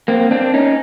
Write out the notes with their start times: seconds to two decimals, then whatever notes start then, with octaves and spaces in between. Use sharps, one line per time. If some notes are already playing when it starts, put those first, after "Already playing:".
0.08 A#3 C4
0.31 C4 D4
0.54 C#4 D#4